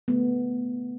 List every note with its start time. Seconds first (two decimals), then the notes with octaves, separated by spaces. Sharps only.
0.08 D3 A3 B3